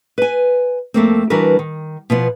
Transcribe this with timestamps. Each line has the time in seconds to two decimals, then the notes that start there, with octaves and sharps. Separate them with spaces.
0.18 B4 G#5
0.94 F2 A3 A#3 C4
1.30 E3 G3 D4 F#4 A#4 B4
1.59 D#3
2.10 B2 F3 B3